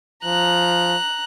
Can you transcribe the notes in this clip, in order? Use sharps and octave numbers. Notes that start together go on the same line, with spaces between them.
F3 A#5 F#6